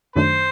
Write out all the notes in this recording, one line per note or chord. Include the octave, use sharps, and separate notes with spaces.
F#2 D#3 F#3 A3 D4 C5